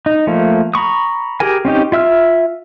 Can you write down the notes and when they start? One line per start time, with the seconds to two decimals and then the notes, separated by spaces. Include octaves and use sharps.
0.06 D#4
0.27 F3 A3 A#3
0.74 A#5 B5 C#6 D#6
1.40 G4 G#4 A#4 G#5
1.65 C4 C#4 D#4 G4
1.92 F4 E5 E6 F6